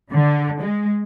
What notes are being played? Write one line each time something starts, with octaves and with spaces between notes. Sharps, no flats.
D3
G#3